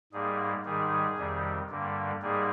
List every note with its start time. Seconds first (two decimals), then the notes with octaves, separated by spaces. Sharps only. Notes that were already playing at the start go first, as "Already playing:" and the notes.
0.12 G#2 G3 A#3 G#4
0.65 G#2 D#3 G3 G#4
1.18 F2 C3 D#3 G3
1.70 G2 D3 G3 A#3
2.22 G#2 G3 A#3 G#4